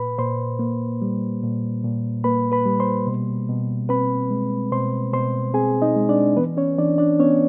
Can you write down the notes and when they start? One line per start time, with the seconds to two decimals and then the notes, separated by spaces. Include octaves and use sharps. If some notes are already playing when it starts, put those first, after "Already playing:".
Already playing: A#2 B4 B5
0.18 A#2 C5 C6
0.59 A#3
1.02 G3
1.43 A#2
1.84 A#2
2.24 A#3 B4 B5
2.52 B4 B5
2.66 G3
2.80 C5 C6
3.07 B2
3.49 B2
3.89 C4 B4 B5
4.30 G#3
4.72 B2 C5 C6
5.13 B2 C5 C6
5.54 C4 G#4 G#5
5.82 D#4 D#5
5.96 G#3
6.09 D4 D5
6.37 E3 B3 B4
6.57 C#4 C#5
6.78 E3 D4 D5
6.98 D4 D5
7.19 B3 C#4 C#5